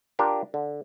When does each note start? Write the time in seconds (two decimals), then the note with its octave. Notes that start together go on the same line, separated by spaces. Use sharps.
0.19 D4 F4 G4 A#4
0.54 D3